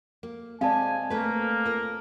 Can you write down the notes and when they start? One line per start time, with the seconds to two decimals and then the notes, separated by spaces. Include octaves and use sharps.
0.23 A#3
0.61 G#3 C4 D5 F5 G#5 A5
1.10 A3 A#3 B4
1.65 F4 A#4